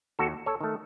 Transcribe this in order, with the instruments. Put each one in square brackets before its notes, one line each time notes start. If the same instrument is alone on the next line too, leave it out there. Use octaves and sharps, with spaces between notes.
[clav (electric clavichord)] D#2 F#4 A4
A4 C#5
D#3 A3